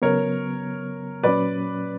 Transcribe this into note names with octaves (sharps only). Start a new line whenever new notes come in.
C#3 F#3 B3 A#4 C#5
A#2 F#3 C#4 B4 D5